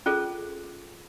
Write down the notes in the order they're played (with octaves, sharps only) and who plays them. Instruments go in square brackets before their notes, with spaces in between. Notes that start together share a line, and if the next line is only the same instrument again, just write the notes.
[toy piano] C#4 F4 G#4 A4